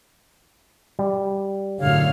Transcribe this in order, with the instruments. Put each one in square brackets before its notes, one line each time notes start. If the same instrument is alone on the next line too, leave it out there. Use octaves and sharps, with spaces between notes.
[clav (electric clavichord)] G3
[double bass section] F#2 A2 D3 [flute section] C#5 F5